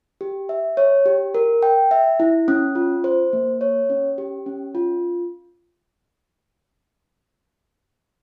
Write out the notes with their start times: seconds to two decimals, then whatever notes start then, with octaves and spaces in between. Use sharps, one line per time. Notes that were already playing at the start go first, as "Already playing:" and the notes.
0.21 G4
0.49 E5
0.77 C#5
1.06 G4
1.34 A#4
1.63 G5
1.91 E5
2.20 E4
2.48 C#4
2.75 F4
3.04 C5
3.33 A#3
3.61 C#5
3.90 C#4
4.18 G4
4.46 C#4
4.75 F4